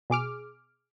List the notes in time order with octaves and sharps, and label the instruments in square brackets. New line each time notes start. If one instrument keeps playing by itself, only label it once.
[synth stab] B2 G#4 D6 F6